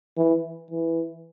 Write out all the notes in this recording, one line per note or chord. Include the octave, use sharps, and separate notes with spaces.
E3
E3